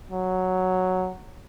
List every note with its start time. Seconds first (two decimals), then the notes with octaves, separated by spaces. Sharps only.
0.11 F#3